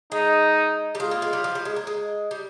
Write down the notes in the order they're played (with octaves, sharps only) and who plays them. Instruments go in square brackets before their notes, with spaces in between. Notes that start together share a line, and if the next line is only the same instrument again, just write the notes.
[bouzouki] G#3 [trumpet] D#4
[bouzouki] G3
[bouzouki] G#3 [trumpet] F4
[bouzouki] A#3
G#3
G3
F3
G3
G#3
A#3
G#3
G3